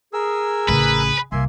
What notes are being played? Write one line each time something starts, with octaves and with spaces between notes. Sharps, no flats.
G#4 A#4 E6
A1 C#3 B4
C2 A#3 E5 G#5 C6